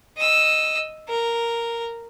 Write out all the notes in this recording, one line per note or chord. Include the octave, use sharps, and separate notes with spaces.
D#5 E6
A#4